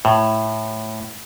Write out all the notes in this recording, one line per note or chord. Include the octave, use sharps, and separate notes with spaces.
A2